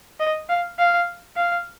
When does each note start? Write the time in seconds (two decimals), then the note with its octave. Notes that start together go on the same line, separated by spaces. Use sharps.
0.20 D#5
0.49 F5
0.79 F5
1.36 F5